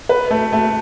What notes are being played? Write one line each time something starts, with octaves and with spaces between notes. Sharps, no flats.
B4
A3
A3